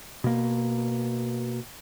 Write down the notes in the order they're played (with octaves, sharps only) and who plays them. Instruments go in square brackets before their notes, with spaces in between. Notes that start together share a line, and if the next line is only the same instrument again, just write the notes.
[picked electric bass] B2 A#3